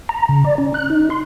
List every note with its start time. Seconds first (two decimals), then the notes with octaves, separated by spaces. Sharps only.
0.09 A#5
0.29 C#3
0.44 D5
0.58 C#4
0.74 F#6
0.90 D#4
1.10 C6